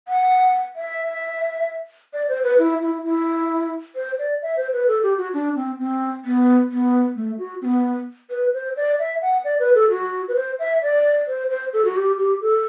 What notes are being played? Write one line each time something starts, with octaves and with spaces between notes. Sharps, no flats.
F#5
E5
D5
C5
B4
E4
E4
E4
C5
D5
E5
C5
B4
A4
G4
F#4
D4
C4
C4
B3
B3
A3
F#4
C4
B3
B4
C5
D5
E5
F#5
D5
B4
A4
F#4
B4
C5
E5
D5
C5
C5
A4
F#4
G4
G4
A4